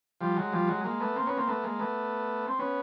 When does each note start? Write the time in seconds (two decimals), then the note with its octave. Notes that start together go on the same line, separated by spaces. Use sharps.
0.20 F3 G3
0.37 F#3 G#3
0.52 F3 G3
0.68 F#3 G#3
0.84 G#3 A#3
1.00 A3 B3
1.16 A#3 C4
1.26 B3 C#4
1.37 A#3 C4
1.48 A3 B3
1.63 G#3 A#3
1.79 A3 B3
2.47 C4
2.59 B3 C#4